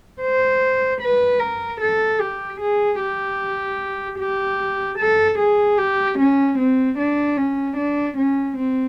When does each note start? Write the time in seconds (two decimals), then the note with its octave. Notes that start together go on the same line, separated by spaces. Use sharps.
0.21 C5
1.01 B4
1.40 A#4
1.81 A4
2.20 G4
2.60 G#4
3.00 G4
4.19 G4
4.98 A4
5.39 G#4
5.78 G4
6.19 C#4
6.58 C4
6.98 D4
7.37 C#4
7.77 D4
8.17 C#4
8.57 C4